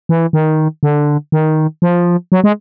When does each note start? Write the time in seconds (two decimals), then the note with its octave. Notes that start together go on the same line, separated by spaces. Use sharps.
0.09 E3
0.33 D#3
0.83 D3
1.32 D#3
1.82 F3
2.32 F#3
2.44 G#3